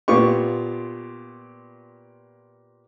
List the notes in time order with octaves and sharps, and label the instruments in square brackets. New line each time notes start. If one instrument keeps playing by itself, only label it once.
[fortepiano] A#2 B3 F4 G4 C#6